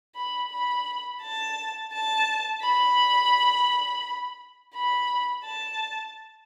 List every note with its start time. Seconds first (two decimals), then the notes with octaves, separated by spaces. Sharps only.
0.15 B5
0.51 B5
1.22 A5
1.93 A5
2.62 B5
4.75 B5
5.45 A5